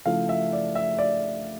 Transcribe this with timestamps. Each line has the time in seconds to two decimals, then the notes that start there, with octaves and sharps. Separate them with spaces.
0.06 C#3 F3 A3 E4 F5
0.29 E5
0.53 D5
0.75 E5
0.99 D5